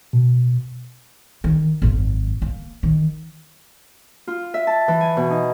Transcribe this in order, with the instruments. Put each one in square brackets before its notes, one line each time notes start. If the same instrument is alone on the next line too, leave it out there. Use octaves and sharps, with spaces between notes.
[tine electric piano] B2
[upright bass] D#3
G#1 F#2
A#3
D#3
[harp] F4
E5
A5
E3
G#5
B2
D#4